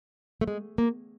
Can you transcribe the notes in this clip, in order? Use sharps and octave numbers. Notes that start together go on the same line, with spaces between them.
A3
G#3
A#3